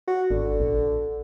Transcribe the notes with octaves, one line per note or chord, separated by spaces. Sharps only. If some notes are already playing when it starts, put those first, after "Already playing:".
F#4
G#1 D3
A#1